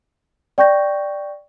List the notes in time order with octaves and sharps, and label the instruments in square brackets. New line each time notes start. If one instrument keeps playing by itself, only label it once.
[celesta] D5 G5 C#6 G6 A#6